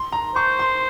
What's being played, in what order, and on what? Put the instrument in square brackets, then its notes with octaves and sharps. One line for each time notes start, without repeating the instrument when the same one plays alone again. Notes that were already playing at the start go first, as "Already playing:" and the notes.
Already playing: [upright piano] C6
A#5
[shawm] C5 [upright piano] C#6
[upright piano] C6